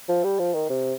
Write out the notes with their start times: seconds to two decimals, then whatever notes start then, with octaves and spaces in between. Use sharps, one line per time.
0.09 F3
0.24 G3
0.39 F3
0.54 D#3
0.70 C3